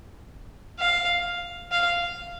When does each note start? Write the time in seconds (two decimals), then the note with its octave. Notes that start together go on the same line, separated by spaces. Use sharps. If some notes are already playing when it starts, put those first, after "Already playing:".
0.79 F5
1.71 F5